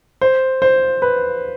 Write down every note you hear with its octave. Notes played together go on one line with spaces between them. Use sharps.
C5
C5
B4